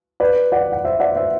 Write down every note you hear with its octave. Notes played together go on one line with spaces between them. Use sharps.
B4 D5
D5 F#5
F#5
C5 E5
D5 F#5
C5 E5